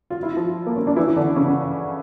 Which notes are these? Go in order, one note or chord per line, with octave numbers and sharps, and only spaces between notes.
F4
E4
F3 F4
A#3
C#4
D4
E3 E4
C#4
D3 D4
C#3 C#4